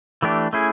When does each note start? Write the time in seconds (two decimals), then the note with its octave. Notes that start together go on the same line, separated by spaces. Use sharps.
0.22 E3 A3 D4 G4
0.53 A3 C#4 E4 G#4